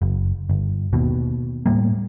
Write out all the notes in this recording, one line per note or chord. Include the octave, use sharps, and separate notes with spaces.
F#1
G1
D#2 B2
A2 G3 A#3